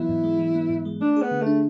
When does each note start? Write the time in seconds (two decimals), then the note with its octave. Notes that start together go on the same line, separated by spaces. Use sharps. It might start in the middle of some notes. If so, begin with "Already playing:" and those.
Already playing: E3 F#3 B3 E4
0.09 G#2
0.24 G#3
0.39 E3
0.54 B3
0.70 G#2
0.85 G#3
1.01 A3 D4
1.16 G#4
1.22 B3
1.31 D3
1.42 A3 D4